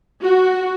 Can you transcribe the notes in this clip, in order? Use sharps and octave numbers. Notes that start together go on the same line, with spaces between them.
F#4